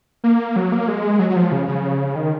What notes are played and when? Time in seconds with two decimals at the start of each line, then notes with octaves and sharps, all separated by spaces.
0.24 A#3
0.56 F#3
0.72 A#3
0.88 G#3
1.19 F#3
1.30 F#3
1.36 F3
1.52 C#3
1.68 C#3
2.15 D#3